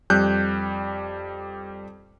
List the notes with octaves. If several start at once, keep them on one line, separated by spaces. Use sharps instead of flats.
F2 G3 F#6 G6